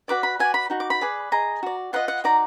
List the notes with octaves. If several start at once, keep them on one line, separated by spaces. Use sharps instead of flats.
F#4 B4 D5 D6
B5
F#4 B4 D5 G#5
B5
D#4 F#4
D6
B5
G#4 B4 D5
G#4 D#5 A#5
F#4 D5
F4 B4 D#5 F#5
F#5
D#4 F#4 D5 A#5